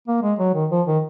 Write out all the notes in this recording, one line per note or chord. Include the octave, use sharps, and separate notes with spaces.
A#3
G#3
F#3
D#3
F3
D#3